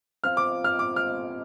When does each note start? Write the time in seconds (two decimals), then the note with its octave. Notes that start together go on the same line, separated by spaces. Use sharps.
0.24 F3 C4 F4 F6
0.37 D6
0.64 F6
0.79 D6
0.96 F6